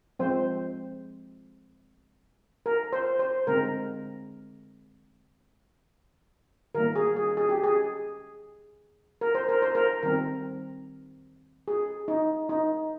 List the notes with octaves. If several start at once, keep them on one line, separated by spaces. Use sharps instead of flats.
F3 G#3 C4 C5
A#4
C5
C5
D3 G#3 C4 A#4
D#3 G3 A#3 A#4
G#4
G#4
G#4
G4
G#4
A#4
C5
A#4
C5
A#4
D#3 G3 C4 A#4
G#4
D#4
D#4